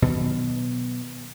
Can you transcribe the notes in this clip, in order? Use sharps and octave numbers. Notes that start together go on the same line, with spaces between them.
B2 D#3 F#3